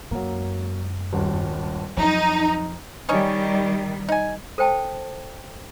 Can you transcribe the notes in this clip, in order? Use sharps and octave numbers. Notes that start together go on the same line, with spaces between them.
F#2 F#3 G#3 A#3
D#1 G#1 G2
F2 F#3 D#4
D#3 G3 C#4 D#4 C#5
D#4 G#5
A4 C5 G5 A5